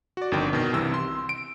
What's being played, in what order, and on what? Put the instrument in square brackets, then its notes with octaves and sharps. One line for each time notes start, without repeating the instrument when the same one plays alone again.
[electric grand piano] F#4 D5
G1 F2 D#3 D4 G5
B2 D#3
C2 C3 E3 E6
C6
D7